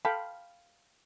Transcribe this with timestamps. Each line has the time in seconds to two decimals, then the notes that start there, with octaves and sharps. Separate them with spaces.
0.05 A4 F5 G5 B5